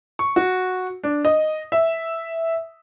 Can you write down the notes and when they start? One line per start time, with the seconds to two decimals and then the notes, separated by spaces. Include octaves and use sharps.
0.19 C#6
0.36 F#4
1.04 D4
1.25 D#5
1.72 E5